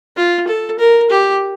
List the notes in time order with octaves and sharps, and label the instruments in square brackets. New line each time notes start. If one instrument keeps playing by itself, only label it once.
[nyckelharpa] F4
A4
A#4
G4